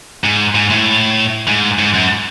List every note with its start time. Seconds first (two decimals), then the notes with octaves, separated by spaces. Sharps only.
0.24 G#2
0.55 G#2
0.70 A2
1.47 G#2
1.79 G#2
1.94 F#2